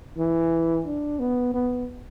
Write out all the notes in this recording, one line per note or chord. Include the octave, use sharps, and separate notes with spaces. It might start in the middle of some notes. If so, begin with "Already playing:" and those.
E3
D4
B3
B3